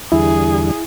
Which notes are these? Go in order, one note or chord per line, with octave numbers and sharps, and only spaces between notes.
E2 D3 G3 E4 G#4